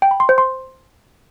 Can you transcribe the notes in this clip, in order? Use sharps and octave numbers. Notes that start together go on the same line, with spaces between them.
G5
B5
C6
C5
C6